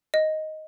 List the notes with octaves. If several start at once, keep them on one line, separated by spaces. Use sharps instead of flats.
D#5